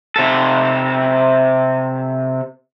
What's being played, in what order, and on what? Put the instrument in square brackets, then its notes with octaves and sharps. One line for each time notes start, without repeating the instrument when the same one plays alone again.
[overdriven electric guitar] C3 A4